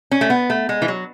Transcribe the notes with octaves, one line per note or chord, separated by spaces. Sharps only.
C#4
A3
B3
A3
G#3
E3
F#3